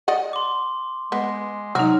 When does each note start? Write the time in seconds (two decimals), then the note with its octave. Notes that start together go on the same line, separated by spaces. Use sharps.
0.08 D5 D#5 F#5
0.33 C6 D6
1.12 G#3 B3
1.75 C3 F#3 D#4 F#4 F6